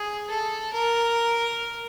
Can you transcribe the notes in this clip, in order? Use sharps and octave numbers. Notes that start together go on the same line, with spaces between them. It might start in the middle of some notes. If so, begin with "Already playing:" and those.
Already playing: G#4
A4
A#4